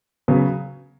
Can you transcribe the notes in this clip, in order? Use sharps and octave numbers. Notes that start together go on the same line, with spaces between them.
C#3 F#3 B3